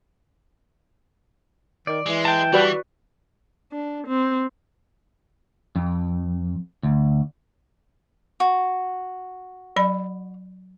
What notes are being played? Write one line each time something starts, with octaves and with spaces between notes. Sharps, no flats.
D#3 D5
E3 G#3
G5 A5
E3 G3 F#4 B4 D5
D4
C4
F2
D2
F#4
F#3 D5 B5